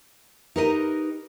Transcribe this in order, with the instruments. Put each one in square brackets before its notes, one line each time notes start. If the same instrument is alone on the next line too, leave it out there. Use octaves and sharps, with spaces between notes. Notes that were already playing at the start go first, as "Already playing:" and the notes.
[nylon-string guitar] D#4 G4 A#4 B4 C#5 D#5